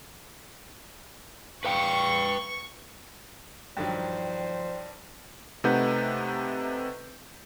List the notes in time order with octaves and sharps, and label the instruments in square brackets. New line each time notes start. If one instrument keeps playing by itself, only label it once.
[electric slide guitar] B4 F5 G5 [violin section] C#6
[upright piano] G2 D#3 F#3 [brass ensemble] F3 C5 [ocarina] D5 [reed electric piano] G5
[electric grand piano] C3 A3 D#4 B4 F#5 G6